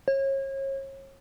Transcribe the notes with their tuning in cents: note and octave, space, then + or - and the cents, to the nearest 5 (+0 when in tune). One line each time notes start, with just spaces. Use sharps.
C#5 -35